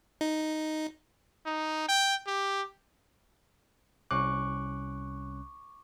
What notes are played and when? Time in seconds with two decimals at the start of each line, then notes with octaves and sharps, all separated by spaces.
0.21 D#4
1.46 D#4
1.89 G5
2.27 G4
4.11 C2 C#4 C#6 D6 F#6